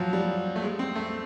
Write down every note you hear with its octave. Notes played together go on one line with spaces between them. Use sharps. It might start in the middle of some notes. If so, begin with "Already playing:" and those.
Already playing: F3 F#3
G3
A3
G#3
C4
A3